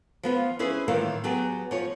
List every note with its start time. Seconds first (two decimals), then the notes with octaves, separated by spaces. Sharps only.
0.23 F3 B3 F4
0.59 C#4 E4 G#4 B4 C5
0.88 A2 D#3 E3 G3 A#3 F4
1.24 F#3 B3 G4 G#4
1.71 F3 C#5